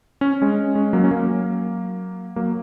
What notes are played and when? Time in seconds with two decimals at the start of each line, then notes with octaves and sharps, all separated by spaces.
0.21 C#4
0.42 G#3 C#4
0.75 G#3 C#4
0.93 F#3 A#3
1.04 C#4
1.11 F#3 A#3
2.36 F#3 A#3